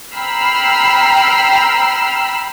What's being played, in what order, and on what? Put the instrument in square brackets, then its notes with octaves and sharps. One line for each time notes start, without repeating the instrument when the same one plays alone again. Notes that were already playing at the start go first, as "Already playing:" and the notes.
[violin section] G5 A#5 B5 E6 F6 C7